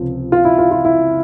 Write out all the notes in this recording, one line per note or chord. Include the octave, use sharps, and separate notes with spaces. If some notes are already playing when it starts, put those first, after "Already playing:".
Already playing: C#2 C3 F3 C4
F4
E4
F4
F4
E4